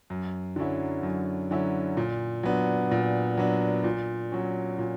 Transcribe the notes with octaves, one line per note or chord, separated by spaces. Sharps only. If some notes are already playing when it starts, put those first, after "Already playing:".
F#2
D3 F#3 C#4 E4
F#2
D3 F#3 C#4 E4
A#2
F#3 B3 D4
A#2
F#3 B3 D4
A#2
F#3 C#4
A#2